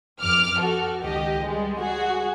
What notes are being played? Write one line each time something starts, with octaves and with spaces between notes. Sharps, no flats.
F2 D6 F6
F#4 A4
C#2 D#3 G4 D#5
G3 G#3
F#4 G#4